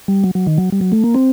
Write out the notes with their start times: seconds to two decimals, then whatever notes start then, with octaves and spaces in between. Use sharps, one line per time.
0.08 G3
0.24 F#3
0.35 F#3
0.47 D#3
0.58 F#3
0.72 G3
0.81 F#3
0.92 A3
1.04 A#3
1.14 C4